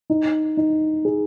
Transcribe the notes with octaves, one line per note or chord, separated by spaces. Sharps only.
D#4
D#4
G#4